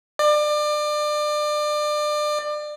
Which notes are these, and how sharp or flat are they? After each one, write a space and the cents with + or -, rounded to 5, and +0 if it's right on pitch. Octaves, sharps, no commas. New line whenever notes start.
D5 +30